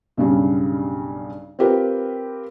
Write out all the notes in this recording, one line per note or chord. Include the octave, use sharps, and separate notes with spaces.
B1 G2 C#3 G3
C4 F4 G4 A#4 B4